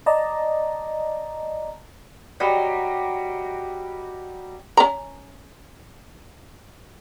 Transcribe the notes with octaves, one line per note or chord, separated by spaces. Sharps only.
D5 D#5 A5 A#5
F#3 G3 D#5
C#4 A#5